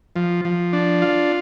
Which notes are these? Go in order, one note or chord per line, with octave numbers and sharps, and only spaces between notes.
F3
F3
D4
F4